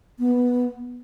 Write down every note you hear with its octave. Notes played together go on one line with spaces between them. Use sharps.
B3